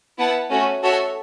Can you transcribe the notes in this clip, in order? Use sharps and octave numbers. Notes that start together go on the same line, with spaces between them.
B3 E4 B4 F#5 A5
A3 C#4 F#4
F#4 A4 C#5 E5